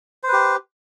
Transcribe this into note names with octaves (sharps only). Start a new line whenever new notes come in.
G4 B4 C5